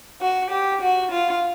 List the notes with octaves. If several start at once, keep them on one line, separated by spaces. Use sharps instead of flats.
F#4
G4
F#4
F4